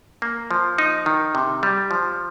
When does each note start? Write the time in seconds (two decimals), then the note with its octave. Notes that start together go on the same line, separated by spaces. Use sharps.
0.22 A#3
0.51 F3
0.78 D#4
1.06 D#3
1.35 C3
1.63 G3
1.91 F3